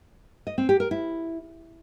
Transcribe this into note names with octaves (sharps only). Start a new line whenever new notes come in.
D#5
C4
G4
A#4
E4